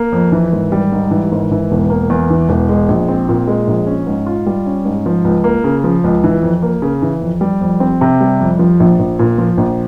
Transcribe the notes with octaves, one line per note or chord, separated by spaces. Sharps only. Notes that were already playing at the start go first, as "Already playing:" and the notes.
Already playing: A#3
F2
E3
G#1
G3
G#2
E3
G#1
E3
E1
A#3
E2
E3
E1
G#3
A#1
C4
A#2
G#3
A#1
C#4
G#2
F4
G3
C#4
G#2
F3
C#2
A#3
C#3
F3
C#2
E3
F2
A#3
C#3
E3
F2
G3
F2
C4
C3
G3
F2
F3
A#1
A#1
A#2
F3
A#1